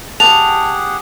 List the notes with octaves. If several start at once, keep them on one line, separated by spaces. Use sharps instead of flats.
G4 G#4 F#5 A5 F7